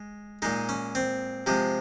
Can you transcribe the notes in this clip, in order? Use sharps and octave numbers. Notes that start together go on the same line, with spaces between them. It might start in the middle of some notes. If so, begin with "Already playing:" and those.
Already playing: G#3
A#2 G#3 D#4
C#4
C4
C3 F3 G#3